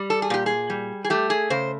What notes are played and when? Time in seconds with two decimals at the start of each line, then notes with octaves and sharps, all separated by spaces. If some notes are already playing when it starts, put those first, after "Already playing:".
Already playing: G3
0.10 A4
0.22 G#4
0.30 A#2 G4
0.46 G#4
0.70 G3
1.04 G#4
1.10 A3 G4
1.30 G#4
1.50 C#3 C5